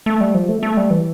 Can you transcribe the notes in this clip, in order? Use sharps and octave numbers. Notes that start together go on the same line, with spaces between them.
A3
G3
F3
A3
A3
G3
E3